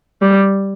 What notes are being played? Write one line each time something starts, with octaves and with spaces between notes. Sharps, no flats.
G3